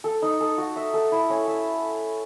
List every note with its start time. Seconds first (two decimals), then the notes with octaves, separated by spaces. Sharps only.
0.04 A4
0.22 D#4
0.41 A4
0.58 F#4
0.76 E5
0.94 A4
1.12 E4
1.30 C#4
1.47 E5